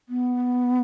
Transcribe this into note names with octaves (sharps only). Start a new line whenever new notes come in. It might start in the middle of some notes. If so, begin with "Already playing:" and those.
B3